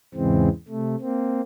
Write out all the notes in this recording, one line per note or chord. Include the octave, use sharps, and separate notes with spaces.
E2 G#2 C#3 E3 G#3 C4
C3 A3
A#3 C4